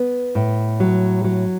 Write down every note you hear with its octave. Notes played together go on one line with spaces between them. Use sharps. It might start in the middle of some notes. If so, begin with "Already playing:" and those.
Already playing: B3
A2
F#3
F#3